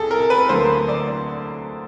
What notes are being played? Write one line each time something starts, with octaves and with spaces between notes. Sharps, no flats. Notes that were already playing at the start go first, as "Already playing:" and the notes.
Already playing: C2 G#4 A4
A#4
B4
D2 D3 F#3 A#3 C5
D5